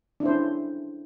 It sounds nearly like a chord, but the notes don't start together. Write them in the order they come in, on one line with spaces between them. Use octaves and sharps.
D4 E4 C5 C#4